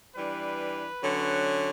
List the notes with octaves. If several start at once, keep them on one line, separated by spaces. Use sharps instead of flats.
E3 G3 D4 B4
D3 F#3 C#4